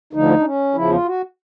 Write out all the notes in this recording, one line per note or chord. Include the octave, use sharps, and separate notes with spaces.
D2 D3 F3 D#4
D4
C#4
E2 C#3 F3 E4
F4
F#4